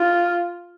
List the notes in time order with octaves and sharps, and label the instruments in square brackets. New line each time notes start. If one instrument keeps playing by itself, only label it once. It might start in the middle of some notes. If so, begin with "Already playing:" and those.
Already playing: [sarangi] F4